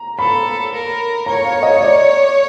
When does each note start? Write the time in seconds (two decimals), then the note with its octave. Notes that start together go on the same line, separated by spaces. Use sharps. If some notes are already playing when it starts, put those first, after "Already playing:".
Already playing: A#5
0.18 A4 B5
0.73 A#4
1.26 C#5 A#5
1.45 F5
1.63 D#5
1.81 D5